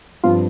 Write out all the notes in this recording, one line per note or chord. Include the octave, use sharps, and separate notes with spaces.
G2 F3 C4 F4